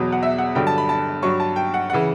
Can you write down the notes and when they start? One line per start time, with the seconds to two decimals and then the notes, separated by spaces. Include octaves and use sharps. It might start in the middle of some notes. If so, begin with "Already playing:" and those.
Already playing: E2 B2 F#3
0.12 F#5
0.23 E5
0.38 F#5
0.55 G2 D3 F#3 G5
0.67 A5
0.78 B5
0.89 A5
1.23 G2 F#3 C#6
1.40 A5
1.56 G5
1.74 F#5
1.90 C#3 E3 F#5